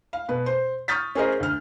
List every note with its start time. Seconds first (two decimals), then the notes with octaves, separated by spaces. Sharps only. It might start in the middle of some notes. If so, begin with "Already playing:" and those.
0.13 F5
0.29 B2 B4
0.46 C5
0.88 C#6 D#6 F6 G6 A6 B6
1.15 C#4 G#4 A#4 C5 D#5
1.40 D2 F6